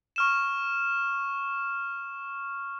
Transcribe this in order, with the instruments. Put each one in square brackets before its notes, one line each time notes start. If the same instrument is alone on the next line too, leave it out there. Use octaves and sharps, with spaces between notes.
[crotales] C#6 F6 E7